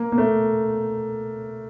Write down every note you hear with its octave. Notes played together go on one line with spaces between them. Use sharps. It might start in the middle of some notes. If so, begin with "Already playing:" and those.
Already playing: A#3
A#3
A3